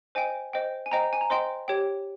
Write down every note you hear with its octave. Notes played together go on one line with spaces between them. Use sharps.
C5 D#5 G5 G#5
C5 D#5 G5
G#5
C5 D#5 G5 A#5
G#5
A#5
C5 D#5 G5 C6
G4 C#5 G5